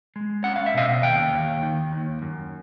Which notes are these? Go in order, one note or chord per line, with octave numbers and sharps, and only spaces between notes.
G#3
C#4 F#5
F5
E5
B2 D#5 F5
D#2 F5 G5
D#2
D#3
D#2
F#2